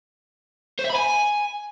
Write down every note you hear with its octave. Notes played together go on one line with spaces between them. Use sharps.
C5
E5
B5
G#5